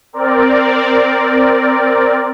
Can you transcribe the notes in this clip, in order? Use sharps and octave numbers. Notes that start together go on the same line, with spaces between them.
C4 A#4 D5